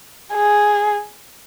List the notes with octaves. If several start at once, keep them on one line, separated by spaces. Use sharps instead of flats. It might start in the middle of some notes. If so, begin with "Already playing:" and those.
G#4